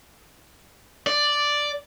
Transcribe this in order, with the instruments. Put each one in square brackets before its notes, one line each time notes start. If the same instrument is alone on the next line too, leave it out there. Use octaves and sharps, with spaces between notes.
[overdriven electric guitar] D5